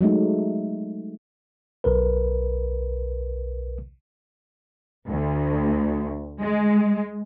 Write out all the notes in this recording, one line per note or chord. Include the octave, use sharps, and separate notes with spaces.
F#3 G#3 A3 D#4
B1 A#4 B4
D2
G#3